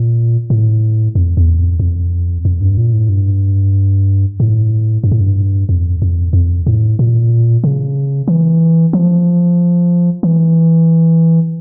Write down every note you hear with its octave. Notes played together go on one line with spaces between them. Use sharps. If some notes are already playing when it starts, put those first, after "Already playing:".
Already playing: A#2
A2
F2
E2
F2
F2
F2
G2
A#2
A2
G2
A2
G2
A2
G2
F2
F2
F2
A2
A#2
C#3
E3
F3
E3